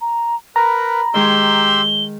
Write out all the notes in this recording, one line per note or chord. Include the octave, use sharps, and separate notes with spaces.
A#5
A#4 B4 A#5 B5
D#3 G#3 G4 G#4 C6 E6 G7